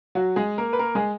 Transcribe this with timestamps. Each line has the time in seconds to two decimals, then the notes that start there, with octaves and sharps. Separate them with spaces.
0.15 F#3 F#4
0.36 G#3 G#4
0.58 A#3 A#4
0.73 B4
0.79 A#3 A#4
0.95 G#3 G#4